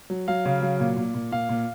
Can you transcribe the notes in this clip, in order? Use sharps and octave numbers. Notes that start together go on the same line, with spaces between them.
F#3
F#3 F5
C#3
F#3
A#2
A#2
A#2
A#2 F5
A#2